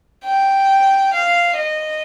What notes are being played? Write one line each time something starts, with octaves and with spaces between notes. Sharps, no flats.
G5
F5
D#5